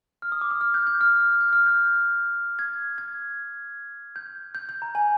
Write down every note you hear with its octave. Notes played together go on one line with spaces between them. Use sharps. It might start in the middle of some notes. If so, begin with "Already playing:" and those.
F6
D#6
D6
D#6
F6
G6
G6
F6
F6
G6
F6
G6
G#6
G#6
G6
G6
G6
A#5
G#5